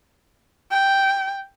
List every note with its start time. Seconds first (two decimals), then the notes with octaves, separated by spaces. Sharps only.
0.71 G5